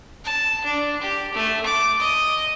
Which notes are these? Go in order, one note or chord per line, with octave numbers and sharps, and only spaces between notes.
A5
D4
G4
A3
D6
D#5